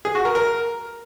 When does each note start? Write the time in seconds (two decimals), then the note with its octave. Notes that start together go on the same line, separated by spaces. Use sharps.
0.05 G#4
0.15 F#4
0.25 A#4
0.35 A#4